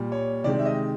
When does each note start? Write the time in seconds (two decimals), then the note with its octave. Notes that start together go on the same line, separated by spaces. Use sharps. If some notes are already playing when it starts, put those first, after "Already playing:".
Already playing: A#2 G3
0.12 C#5
0.44 C3 D#3 G#3 D5
0.59 E5
0.66 D#5